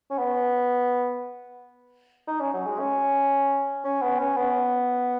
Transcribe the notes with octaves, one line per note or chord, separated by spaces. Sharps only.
C#4
B3
D#4
C#4
F#3
G#3
C#4
C#4
B3
C#4
B3